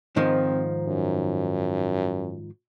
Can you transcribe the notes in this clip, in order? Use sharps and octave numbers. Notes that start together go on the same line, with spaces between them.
G#2 D#3 F3 C4
F#2